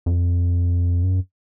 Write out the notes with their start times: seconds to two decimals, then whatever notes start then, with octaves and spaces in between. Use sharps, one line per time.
0.06 F2
1.03 F#2